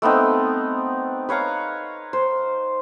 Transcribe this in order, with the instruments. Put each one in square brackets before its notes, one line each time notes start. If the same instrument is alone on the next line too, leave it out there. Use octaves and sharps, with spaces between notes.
[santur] A3 B3 C4 D#4
B4 C#5 F5 A#5
C5